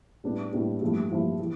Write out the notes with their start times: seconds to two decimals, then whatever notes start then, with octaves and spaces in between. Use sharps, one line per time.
0.24 A2 G3 B3 D4 G4
0.52 A2 G3 B3 D4 G4
0.82 G2 F3 A3 E4
1.10 G2 F3 A3 E4
1.40 E3